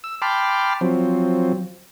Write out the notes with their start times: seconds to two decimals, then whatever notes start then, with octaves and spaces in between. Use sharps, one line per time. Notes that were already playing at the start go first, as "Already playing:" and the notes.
0.04 E6
0.22 G5 A5 B5 C6 D6 F6
0.81 F3 F#3 C4